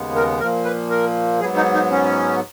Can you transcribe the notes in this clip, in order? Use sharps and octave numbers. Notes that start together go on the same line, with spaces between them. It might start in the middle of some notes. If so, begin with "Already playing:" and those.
Already playing: D#2 C#3 G#3 B3
A#4
A#2 F3 A#3 A#4
B4
A#4
G#2 F#3 B3 G#4
D#4
D#4
C#4